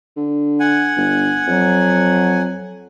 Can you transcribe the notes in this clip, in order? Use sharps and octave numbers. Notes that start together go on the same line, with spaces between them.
D3
F#5 G#5
G1
F2 F#3